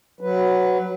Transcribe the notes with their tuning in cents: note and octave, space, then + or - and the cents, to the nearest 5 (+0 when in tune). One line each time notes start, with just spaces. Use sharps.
F#3 +0 B4 +5